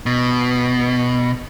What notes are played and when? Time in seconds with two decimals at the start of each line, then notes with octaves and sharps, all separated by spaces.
0.06 B2